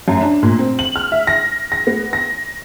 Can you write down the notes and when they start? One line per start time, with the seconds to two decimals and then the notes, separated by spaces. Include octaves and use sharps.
0.08 F#2
0.21 D4
0.43 A#2
0.59 C4
0.79 F#7
0.96 F6
1.12 E5
1.27 A#6
1.72 A#6
1.87 B3
2.13 A#6